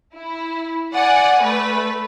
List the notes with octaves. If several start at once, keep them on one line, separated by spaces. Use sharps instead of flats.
E4
D5 F#5 G#5
A3 B4